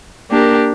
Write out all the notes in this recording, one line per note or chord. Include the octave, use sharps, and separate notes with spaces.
A#3 D4 G4 A#4